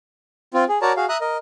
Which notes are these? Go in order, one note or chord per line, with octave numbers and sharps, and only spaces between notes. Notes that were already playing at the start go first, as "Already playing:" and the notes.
C4 F4
G#4
F#4 A#4 C#5 D5 A5 A#5
F#4 G#4 F5
E5 A#5 D#6 F#6
A#4 D#5